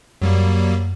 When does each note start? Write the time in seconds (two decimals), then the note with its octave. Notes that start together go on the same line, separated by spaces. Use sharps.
0.21 F#2 F#3 G3 A#3